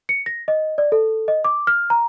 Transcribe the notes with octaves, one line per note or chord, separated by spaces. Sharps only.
C#7
A#6
D#5
D5
A4
D#5
D6
F6
A#5